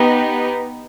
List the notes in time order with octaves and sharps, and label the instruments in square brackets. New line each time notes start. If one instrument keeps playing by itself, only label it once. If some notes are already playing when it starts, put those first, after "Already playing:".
Already playing: [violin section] B3 D#4 G4